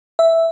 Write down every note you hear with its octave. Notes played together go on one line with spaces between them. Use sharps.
E5